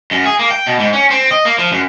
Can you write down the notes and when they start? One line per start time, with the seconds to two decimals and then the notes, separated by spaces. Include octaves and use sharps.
0.11 F#2
0.26 G#4
0.39 A#3
0.51 G5
0.67 B2
0.80 G#2
0.93 C#4
1.11 C4
1.31 D#5
1.45 A#3
1.59 F3
1.72 F#2